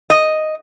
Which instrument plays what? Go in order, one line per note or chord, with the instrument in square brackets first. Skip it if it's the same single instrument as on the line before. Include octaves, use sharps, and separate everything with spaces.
[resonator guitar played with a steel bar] D#5